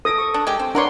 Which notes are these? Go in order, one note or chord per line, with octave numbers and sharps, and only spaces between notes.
A4 D#6 A#6 D7
C#6
D4
G#3 G4
C4
D4 A#4 B4 C#5 F#5 C6 D6